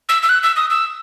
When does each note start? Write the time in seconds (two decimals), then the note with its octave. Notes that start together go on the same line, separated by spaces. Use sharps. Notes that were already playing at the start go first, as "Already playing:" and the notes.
0.09 E6
0.23 E6
0.29 F#6
0.43 E6
0.56 D#6
0.70 E6